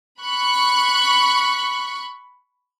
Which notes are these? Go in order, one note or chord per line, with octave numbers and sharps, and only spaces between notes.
B5 C#6 F#6